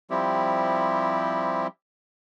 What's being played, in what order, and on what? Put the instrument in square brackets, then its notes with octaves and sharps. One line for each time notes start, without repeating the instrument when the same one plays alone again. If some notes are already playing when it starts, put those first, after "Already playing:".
[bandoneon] F3 G3 C4 E4 G4